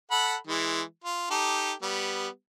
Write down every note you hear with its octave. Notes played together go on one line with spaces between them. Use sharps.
A4 F#5 B5
E3 G#3
F4
D#4 G4 A4
G3 B3